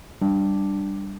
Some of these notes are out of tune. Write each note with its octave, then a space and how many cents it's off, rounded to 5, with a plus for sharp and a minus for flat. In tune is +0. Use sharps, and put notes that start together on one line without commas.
G3 +0 D4 +0